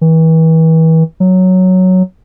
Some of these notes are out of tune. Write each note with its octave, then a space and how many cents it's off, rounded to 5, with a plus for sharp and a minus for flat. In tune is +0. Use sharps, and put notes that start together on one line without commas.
E3 -35
F#3 +0